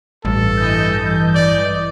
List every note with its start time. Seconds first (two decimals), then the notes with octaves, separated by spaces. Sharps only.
0.25 A1 G2 A4
0.57 E3 D#5 G6
1.35 D5